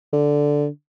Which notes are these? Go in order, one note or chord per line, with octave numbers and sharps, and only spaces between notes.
D3